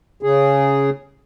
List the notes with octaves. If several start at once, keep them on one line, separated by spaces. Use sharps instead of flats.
C#3 G#4